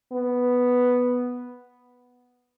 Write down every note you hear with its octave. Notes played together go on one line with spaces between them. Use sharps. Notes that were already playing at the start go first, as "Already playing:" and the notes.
B3